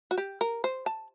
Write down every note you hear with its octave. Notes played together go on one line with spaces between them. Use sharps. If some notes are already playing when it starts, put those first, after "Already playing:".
F#4
G4
A#4
C5
A5